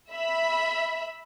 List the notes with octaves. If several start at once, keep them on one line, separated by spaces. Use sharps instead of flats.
E5 B5